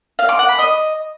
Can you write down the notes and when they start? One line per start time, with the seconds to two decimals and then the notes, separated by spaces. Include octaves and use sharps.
0.19 F5
0.29 D6
0.39 F#5
0.49 B5
0.59 D#5